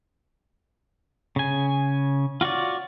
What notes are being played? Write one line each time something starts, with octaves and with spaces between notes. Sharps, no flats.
C#3 G#5
F4 F#4 C#5 D5